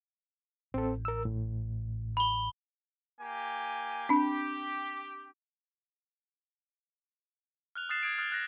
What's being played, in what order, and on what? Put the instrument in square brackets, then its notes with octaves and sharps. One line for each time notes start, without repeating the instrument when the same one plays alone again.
[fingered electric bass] A1 [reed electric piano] C4 A4
[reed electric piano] A#4 E6
A2
[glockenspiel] B5 G7
[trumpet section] A#3 G4 G#5
[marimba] C4 D4 [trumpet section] G4
[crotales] F6 F#6 F7
D#6 F6 F#6 A6 C7 E7
D#6 G#6 D7
D#6 F6 F#6 A6
F#6 A#6